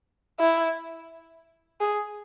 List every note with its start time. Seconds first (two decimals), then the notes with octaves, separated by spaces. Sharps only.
0.40 E4
1.80 G#4